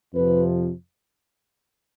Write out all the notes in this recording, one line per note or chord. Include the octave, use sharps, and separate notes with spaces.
F2 C3 F3 B4